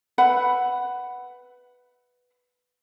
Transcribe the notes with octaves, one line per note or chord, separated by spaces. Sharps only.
B4 E5 F#5 B5